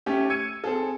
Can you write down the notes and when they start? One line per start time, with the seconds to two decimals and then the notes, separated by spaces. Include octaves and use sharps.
0.06 A3 C#4 G4
0.30 E6 G#6 C#7 D#7
0.64 C4 G#4 A4